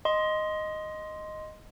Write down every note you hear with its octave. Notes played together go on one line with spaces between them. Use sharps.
D#5 C6